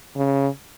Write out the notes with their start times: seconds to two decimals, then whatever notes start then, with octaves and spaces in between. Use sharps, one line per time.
0.16 C#3